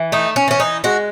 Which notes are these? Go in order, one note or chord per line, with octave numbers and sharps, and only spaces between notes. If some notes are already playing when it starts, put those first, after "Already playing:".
Already playing: E3
A3 D#4
C#4
E3 C#4
D#4
G#3 F#4